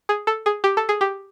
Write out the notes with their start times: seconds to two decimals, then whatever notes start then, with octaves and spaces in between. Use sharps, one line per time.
0.09 G#4
0.27 A4
0.46 G#4
0.64 G4
0.77 A4
0.89 G#4
1.01 G4